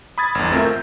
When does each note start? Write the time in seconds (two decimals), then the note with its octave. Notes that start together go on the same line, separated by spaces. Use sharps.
0.18 B5 D#6 G#6 A6
0.35 G1 E2
0.52 A3 C4 F4 A#4 E5
0.65 G6